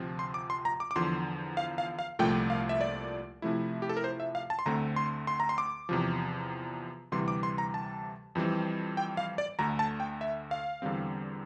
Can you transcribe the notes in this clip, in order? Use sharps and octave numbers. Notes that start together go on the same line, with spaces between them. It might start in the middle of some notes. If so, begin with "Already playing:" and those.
Already playing: D2 C3 F3 C4
C6
D6
C6
A#5
D6
D6
E2 D3 F3 C6
F5
F5
F5
C2 A#2 F3 A3 G5
F5
E5
D5
C3 F3 A3 E4
G4
A4
A#4
C5
E5
F5
A5
C6
D2 D3 A3 C4 A#5
C6
C6
A#5
C6
D6
E2 C3 F3
D2 C3 E3 G3 C6
D6
C6
A#5
A5
F2 E3 G3 C4
G5
F5
D5
D2 D3 A3 A#5
A5
G5
E5
F5
E2 D3 G3 C4